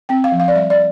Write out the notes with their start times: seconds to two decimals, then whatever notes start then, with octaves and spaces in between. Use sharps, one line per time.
0.09 C4 G5
0.24 F5
0.32 F3
0.40 F5
0.48 D5
0.55 G3 E5
0.70 D5